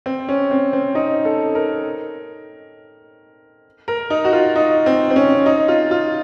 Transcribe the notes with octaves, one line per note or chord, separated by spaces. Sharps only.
C4
C#4
C4
C4
D#4
A4
A#4
A#4
D#4
F#4
F4
D#4
C4
C4
C#4
D#4
F4
F4